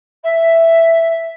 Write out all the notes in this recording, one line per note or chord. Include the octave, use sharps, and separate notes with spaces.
E5